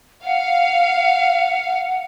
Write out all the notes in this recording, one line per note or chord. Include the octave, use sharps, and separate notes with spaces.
F5 F#5